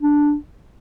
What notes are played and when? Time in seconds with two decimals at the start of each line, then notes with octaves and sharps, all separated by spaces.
0.01 D4